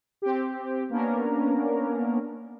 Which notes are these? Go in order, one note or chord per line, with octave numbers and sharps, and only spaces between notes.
C4 G4
A#3 B3 C#4 D4 A#4